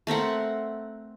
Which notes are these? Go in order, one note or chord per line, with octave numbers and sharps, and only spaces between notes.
A3 C4 A#4 F#5